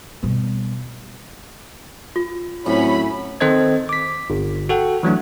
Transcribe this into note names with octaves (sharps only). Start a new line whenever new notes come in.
B2 G3
F4
A2 F#3 C4 C#4 B5
D#3 C4 A4 C5 D#5 G#6
D6 B6
G1
F#4 A4 F#5 G5
E3 F#3 A3 D4